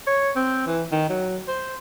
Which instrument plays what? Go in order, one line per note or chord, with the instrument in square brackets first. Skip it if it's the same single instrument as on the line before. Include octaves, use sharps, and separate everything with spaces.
[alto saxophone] C#5
C4
E3
D#3
F#3
C5